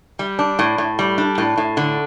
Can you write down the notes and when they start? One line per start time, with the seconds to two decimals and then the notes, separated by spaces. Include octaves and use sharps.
0.19 G3
0.39 D4
0.59 A2
0.78 A2
0.99 G3
1.18 D4
1.38 A2
1.58 A2
1.77 D3